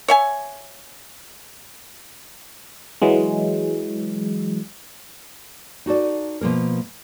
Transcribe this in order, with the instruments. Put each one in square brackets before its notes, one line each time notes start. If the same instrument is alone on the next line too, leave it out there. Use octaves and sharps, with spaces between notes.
[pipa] C#5 E5 G#5
[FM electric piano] E3 F#3 G#3
[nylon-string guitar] D#4 F#4 A4 D5
B2 F3 A#3 A#4